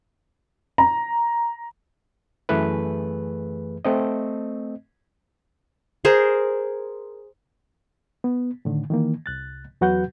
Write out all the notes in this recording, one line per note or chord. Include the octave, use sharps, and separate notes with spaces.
A#5
F#2 E3 A3 G#4 B4
A3 C4 D#5
G#4 A#4 C5
B3
A2 D3 D#3
D#3 E3 A#3
C2 F#6 A6
E2 F#3 F#4 B4 F#5 G6